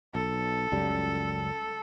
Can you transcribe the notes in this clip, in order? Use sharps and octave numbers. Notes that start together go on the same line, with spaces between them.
B1 A4
C#2 F#2 G3